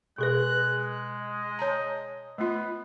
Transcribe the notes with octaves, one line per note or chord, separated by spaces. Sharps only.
B2 G#3 G#4 B4 F#6
D#5
C#5 A5 A#5
A3 B3 F4